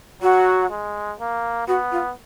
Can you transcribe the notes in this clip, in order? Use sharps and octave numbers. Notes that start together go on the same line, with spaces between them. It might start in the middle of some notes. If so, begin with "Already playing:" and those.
F#3 F#4
G#3
A#3
B3 F#4
F4